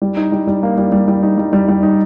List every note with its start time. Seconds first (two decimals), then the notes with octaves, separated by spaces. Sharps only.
0.02 G3
0.17 D#4
0.32 G3
0.47 G3
0.63 A#3
0.78 G3
0.92 G3
1.08 G3
1.23 D#4
1.38 G3
1.53 G3
1.68 G3
1.83 D#4